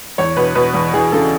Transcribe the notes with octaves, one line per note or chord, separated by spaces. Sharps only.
E2 C#5
B2 B4
B2 B4
E2
E3 G#4
C#3 A4